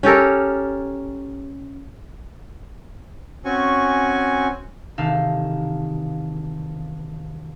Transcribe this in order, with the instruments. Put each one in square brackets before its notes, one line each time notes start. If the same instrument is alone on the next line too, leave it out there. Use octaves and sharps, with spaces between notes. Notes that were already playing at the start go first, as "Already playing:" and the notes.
[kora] C#4 G4 A4 A#4
[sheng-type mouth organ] C4 C#4 F#4 G#5 C#6
[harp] E1 C3 D#3 A4 F5